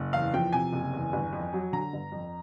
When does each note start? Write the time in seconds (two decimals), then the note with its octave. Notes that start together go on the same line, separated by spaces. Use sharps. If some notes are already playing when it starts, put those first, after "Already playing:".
Already playing: F#1
0.13 E2 F5
0.33 F3 G5
0.53 C3 G#5
0.73 F#1
0.93 E2
1.13 G1
1.33 F2
1.53 F#3
1.73 D3 A#5
1.93 G1
2.12 F2